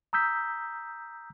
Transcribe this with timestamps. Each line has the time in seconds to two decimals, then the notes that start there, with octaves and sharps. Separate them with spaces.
0.13 A#5 D#6 E6 G6 B6